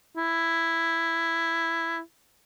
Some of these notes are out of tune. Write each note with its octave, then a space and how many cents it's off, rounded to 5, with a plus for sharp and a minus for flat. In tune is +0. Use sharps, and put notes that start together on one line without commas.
E4 +5